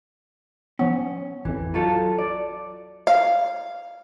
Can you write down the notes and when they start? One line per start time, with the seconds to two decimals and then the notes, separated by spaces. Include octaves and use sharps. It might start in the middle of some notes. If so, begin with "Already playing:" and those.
0.79 F3 B3 C#4
1.45 A1 F2 E3
1.74 F#3 F4 A4
2.18 D5
3.07 F5